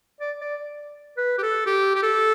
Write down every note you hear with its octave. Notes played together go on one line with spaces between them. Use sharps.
D5
D5
B4
G4
A4
G4
G4
A4